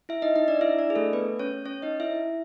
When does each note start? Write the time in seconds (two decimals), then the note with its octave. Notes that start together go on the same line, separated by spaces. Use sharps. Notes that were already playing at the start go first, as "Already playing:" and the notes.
0.09 E4 E5
0.22 D#4 D#5
0.36 D#4 D#5
0.48 D4 D5
0.61 E4 E5
0.79 D4 D5
0.90 G#4
0.95 A3 A4
1.13 B3 B4
1.39 C#4 C#5
1.66 C#4 C#5
1.82 D#4 D#5
2.00 E4 E5